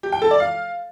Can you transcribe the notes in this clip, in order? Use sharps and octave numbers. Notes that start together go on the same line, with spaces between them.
G4
G5
A4
D5
F5